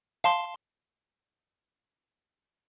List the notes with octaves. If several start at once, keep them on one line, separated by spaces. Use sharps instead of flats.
F5 A5 C6